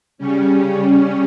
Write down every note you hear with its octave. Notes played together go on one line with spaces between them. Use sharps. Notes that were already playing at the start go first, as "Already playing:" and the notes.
C#3 G3 C#4